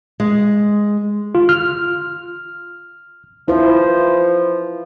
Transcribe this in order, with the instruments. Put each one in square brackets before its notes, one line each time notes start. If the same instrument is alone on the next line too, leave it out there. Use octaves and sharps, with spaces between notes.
[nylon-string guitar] G#3
[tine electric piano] F4
F6
[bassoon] F3 [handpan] E4 B4 C5